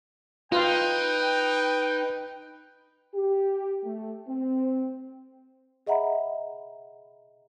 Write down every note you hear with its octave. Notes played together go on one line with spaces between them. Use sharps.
D#4 F4 B4 F5 G5
G4
A3
C4
G#4 D#5 E5 F#5 A#5 B5